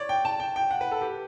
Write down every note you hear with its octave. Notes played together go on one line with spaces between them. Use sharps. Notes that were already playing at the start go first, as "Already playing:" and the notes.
Already playing: C#5 D5
G5
A5
G5
G5
F#5
B4
A4
G4